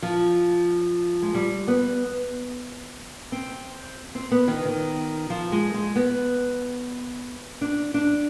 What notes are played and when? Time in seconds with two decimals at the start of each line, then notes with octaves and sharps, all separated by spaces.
0.02 F3
1.22 G#3
1.35 G3
1.68 B3
3.32 C4
4.15 C4
4.31 B3
4.48 D#3
4.65 D#3
5.30 F3
5.52 G#3
5.74 G#3
5.96 B3
7.61 D4
7.94 D4